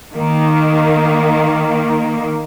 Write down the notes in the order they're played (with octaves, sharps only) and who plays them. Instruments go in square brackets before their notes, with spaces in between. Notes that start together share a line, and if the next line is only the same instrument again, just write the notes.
[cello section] D#3 A#3